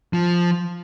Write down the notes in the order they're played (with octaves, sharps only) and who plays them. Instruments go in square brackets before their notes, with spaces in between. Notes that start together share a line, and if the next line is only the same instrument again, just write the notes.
[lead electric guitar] F3